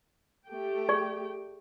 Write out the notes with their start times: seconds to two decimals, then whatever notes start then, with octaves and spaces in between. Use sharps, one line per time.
0.49 A3 G4 G5
0.89 G#4 D5 C#6